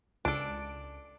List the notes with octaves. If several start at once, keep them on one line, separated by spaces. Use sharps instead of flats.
C#2 D4 A4 D7